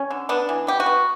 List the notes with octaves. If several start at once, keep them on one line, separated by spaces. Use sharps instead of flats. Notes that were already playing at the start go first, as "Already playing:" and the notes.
Already playing: C#4
D3
B3 D4
E3
B3 G4
F#4
B3